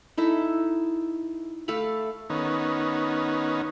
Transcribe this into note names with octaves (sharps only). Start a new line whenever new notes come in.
D#4 E4 A4 E5
A3 A4 F5 B5
D#3 B3 C#4 D#4